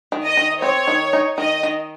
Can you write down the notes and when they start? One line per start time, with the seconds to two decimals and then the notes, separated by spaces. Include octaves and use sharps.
0.12 D#3
0.25 D#5
0.37 D#3
0.62 C4 C#5
0.88 D#3
1.13 D#4
1.38 D#3 D#5
1.63 D#3